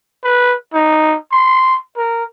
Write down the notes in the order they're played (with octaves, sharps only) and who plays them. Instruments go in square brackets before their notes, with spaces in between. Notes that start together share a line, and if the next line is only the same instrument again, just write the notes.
[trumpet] B4
D#4
C6
A#4